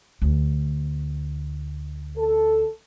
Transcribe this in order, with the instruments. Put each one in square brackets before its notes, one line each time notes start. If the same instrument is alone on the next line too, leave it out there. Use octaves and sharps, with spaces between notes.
[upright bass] D2
[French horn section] A4